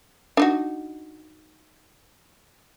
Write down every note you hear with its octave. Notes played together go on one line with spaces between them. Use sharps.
D4 D#4 F#4